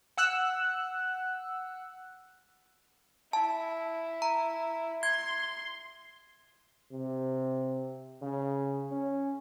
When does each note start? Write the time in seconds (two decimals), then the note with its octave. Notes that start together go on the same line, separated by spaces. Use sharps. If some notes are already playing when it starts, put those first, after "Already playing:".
0.18 F#5 E6 F#6
3.33 E4 A5
4.22 A#5
5.03 C6 G#6
6.92 C3
8.22 C#3
8.91 C#4